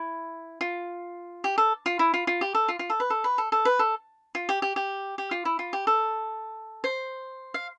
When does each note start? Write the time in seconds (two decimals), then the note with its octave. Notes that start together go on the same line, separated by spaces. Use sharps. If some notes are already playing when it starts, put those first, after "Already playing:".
Already playing: E4
0.61 F4
1.44 G4
1.58 A4
1.86 F4
1.99 E4
2.14 F4
2.27 F4
2.41 G4
2.54 A4
2.68 F4
2.79 F4
2.90 A4
3.00 B4
3.10 A4
3.24 B4
3.38 A4
3.52 A4
3.65 B4
3.79 A4
4.35 F4
4.49 G4
4.62 G4
4.76 G4
5.18 G4
5.31 F4
5.45 E4
5.59 F4
5.73 G4
5.87 A4
6.84 C5
7.54 F5